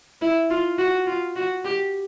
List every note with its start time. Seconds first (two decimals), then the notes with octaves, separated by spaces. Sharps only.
0.21 E4
0.50 F4
0.78 F#4
1.07 F4
1.36 F#4
1.65 G4